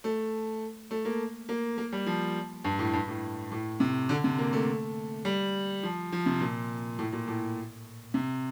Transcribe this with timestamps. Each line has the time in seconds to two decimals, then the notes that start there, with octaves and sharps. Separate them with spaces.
0.04 A3
0.91 A3
1.05 A#3
1.49 A#3
1.78 A#3
1.92 G3
2.06 F3
2.64 G2
2.79 A2
2.93 G2
3.08 A2
3.52 A2
3.80 C3
4.09 D3
4.24 C3
4.39 A#3
4.53 A3
5.25 G3
5.83 F3
6.12 F3
6.26 C3
6.41 A#2
6.99 A2
7.13 A#2
7.28 A2
8.14 C3